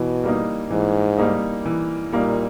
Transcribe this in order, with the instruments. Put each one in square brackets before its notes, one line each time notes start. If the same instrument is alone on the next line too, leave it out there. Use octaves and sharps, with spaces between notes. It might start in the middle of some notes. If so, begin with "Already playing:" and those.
Already playing: [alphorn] B2 [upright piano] E3
[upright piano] G3 A#3 D#4
[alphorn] G#2 [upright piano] E3
[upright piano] G3 A#3 D#4
E3
[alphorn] A#2 [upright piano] G3 A#3 D#4